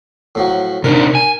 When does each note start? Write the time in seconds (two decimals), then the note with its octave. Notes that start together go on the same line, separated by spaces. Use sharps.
0.35 A2 F3 F#3
0.84 C3 D4 D#4 A#4
1.15 G#5